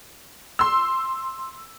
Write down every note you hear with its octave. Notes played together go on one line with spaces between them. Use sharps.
C6 E6